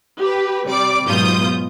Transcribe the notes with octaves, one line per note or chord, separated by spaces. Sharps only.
G4 B4
C3 G3 D5 D6
G#2 B2 F#3 F4 D#6 G6